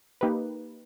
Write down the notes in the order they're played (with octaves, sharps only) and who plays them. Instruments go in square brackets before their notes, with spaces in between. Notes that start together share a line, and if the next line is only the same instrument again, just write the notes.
[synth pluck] A#3 D#4 G4 B4